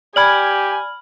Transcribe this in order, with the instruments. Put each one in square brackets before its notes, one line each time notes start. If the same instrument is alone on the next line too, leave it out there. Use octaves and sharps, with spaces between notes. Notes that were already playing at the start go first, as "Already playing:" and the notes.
[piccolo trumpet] G4 [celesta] D5 G#6 [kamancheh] G#5 [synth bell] B5 F6 F#7